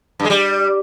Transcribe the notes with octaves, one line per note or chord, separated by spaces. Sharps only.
G2
G#3
G3